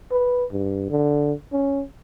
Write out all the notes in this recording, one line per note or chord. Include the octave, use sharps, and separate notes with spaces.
B4
G2
D3
C#4